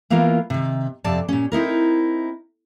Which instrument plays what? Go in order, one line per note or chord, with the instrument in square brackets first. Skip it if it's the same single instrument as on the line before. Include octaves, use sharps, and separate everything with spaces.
[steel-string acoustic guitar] E3 A#3 B3 F4 A#4 F5
C3 D#3
F2 C3 D5 A5
A#2 C#4
C4 D#4 E4 A#4